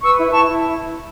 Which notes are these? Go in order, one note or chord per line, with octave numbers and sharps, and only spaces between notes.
B4 C#6 E6
E4
E4 A5 C#6
E4